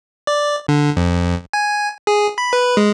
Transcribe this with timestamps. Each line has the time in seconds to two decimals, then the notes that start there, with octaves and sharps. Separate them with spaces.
0.27 D5
0.68 D3
0.97 F2
1.53 G#5
2.07 G#4
2.38 B5
2.53 B4
2.77 G#3